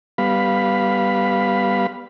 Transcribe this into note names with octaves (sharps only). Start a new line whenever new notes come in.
G3 B3 F5 B5